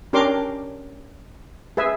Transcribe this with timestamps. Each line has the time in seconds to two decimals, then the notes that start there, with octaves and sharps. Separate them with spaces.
0.13 C#4 D4 G4 A#4 C6 D6
1.77 G#4 B4 E5 G#5